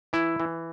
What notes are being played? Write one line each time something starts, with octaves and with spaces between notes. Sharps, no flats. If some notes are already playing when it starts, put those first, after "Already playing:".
E3 E4
E3